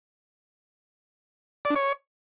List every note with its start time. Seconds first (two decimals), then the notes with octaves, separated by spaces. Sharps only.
1.65 D5
1.70 D4
1.76 C#5